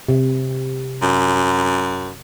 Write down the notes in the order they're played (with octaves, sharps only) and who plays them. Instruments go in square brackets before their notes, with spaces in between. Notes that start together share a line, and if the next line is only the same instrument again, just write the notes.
[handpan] C3
[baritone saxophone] F#2